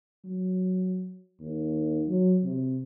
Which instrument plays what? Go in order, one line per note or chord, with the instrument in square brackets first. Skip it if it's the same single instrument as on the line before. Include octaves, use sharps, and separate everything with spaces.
[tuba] F#3
D#2
F#3
C3